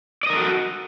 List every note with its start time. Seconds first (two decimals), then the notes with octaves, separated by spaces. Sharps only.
0.23 D5
0.27 D#5
0.30 A#4
0.33 A4
0.36 F#4